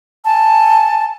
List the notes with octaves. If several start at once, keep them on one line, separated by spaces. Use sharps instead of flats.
G#5 A5